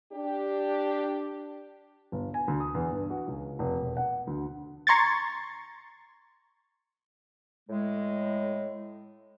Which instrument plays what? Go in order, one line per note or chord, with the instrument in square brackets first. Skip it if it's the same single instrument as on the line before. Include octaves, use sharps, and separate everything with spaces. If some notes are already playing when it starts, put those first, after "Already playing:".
[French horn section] D4 G4
[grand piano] G1
G#5
D2
D#6
E2
G2
F#4
C#2
F1
E1
F#5
D2
[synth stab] A#5 C6 C#6 G#6 A6
[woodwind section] A2 G#3